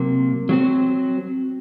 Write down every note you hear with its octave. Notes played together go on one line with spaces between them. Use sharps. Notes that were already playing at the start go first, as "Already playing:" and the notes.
Already playing: C3 F#3 A#3
F#3 C4 F#4 C5